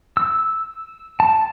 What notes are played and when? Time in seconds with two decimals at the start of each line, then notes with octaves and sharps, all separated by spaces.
0.17 E6
1.20 A5